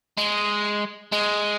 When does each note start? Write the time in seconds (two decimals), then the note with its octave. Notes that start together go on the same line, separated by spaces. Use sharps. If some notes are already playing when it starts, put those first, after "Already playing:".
0.17 G#3
1.12 G#3